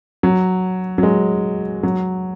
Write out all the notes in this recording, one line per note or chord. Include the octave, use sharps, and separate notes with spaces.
F#3
F#3
G#3
F#3